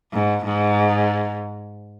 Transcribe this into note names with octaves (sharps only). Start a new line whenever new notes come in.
G#2
G#2